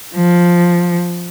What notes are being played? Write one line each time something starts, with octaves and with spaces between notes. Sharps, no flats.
F3